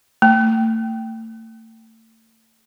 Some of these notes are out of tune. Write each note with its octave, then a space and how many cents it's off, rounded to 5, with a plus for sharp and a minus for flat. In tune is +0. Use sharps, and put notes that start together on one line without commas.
A3 +35